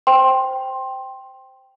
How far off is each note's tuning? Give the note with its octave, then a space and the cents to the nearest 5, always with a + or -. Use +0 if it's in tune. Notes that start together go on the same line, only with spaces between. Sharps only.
C5 +0 G5 +0 C6 +15